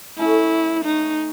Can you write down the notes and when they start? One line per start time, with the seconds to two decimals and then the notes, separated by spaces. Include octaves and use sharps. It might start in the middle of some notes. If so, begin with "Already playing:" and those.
0.18 A3 C#4 E4
0.84 D#4